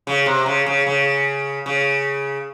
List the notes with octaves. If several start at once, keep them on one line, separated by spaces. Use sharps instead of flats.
C#3
C3
C#3
C#3
C#3
C#3